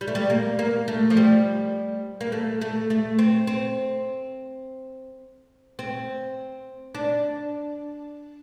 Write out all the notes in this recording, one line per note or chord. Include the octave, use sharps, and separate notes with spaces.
G3
A3
G3
A#3
A#3
A3
F3
G3
A#3
A3
A3
A3
C4
C4
C4
D4